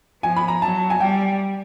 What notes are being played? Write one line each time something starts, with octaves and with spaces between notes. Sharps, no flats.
F3 G#5
B5
A#5
F#3 A5
G#5
G3 G5